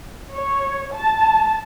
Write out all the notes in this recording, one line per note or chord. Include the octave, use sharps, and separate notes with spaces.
C#5
A5